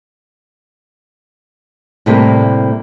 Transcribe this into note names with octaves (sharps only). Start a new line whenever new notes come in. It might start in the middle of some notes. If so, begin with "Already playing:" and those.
A2 C3 G3 A#3